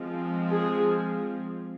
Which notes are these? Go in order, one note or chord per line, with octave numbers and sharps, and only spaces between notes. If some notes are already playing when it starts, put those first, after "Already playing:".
Already playing: F3 G#3 C4
G#4